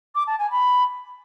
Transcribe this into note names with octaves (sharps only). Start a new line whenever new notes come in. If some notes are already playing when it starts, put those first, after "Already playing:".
D6
A5
G#5
B5